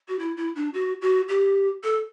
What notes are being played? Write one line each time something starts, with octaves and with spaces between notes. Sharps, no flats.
F#4
E4
E4
D4
F#4
F#4
G4
A4